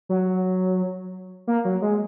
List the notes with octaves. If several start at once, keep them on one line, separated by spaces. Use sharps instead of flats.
F#3
A#3
F#3
G#3